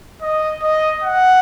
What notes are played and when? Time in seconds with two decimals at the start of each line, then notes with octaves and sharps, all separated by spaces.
0.21 D#5
0.62 D#5
1.03 F#5